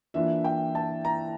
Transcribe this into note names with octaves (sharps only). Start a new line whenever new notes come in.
E3 A#3 D4 F4 E5
G5
A5
A#5